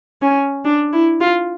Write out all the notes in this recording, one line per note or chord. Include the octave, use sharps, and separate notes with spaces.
C#4
D4
E4
F4